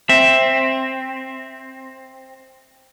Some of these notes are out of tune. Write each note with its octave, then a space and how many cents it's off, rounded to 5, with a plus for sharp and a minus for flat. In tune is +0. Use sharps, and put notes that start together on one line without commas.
C4 +10 E5 +0